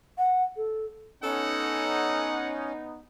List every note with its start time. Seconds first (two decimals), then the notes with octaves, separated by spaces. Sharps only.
0.18 F#5
0.57 A4
1.23 B3 C#4 D#4 A4 F#5